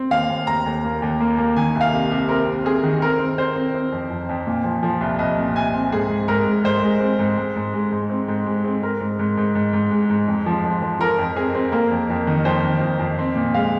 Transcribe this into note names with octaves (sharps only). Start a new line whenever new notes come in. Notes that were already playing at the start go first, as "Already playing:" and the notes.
Already playing: C4
D#2 F5
D#2
D#2 A#5
D#2
A#3
D#2
A#3
A#3
D#3 G#5
C2
F5
C3
C3
C4 A#4
C3
C4 G#4
D#3
C4 A#4
C4
C4 C5
C4
C4
F2
F2
F2
A#2
F3
F3
C2
C2 D#5
A#2
C2 G#5
C4
G#2 G#4
G#2
G#2 A#4
G#3
G#2 C5
G#3
C4
G#2
G#2
G#2
G#3
G#2
C4
G#2
G#3
C4
G#2 A#4
G#2
G#2
G#2
G#2
G#2
G#3
G#2
F2
F3
F3
F3
F3 A#4
F2
C4 G#4
C4
A#3 A#4
F2
F2
D#3
F2 C5
D#3
F2
F2
C4
A#2
G#3 F5